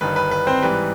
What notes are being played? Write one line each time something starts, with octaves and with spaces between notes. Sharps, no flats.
G1 G2 D#3 B4
B4
B4
C4 C5
G#2 E3 G3 B4